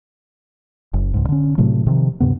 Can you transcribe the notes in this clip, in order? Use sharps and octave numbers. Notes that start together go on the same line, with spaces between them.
F#1
C#2 G#2
D3 C#4
A2 C3 F#3 A3
C3 D#3 F3
D2 G2 C3 B3